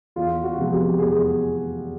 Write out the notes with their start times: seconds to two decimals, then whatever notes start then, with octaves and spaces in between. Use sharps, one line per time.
0.16 E2 F4
0.44 F#4
0.58 C3 F3 G#3 B3
0.72 G4
0.99 E2 G#4